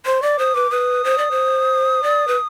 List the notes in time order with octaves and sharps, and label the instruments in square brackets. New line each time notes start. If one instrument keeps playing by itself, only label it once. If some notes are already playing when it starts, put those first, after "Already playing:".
[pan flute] C5 [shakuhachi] C6
[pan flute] D5 [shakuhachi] D6
[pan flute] C5 [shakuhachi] D#6
[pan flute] B4 [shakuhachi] D6
[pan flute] B4 [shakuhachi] D#6
[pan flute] C5
D5
C5
D5
B4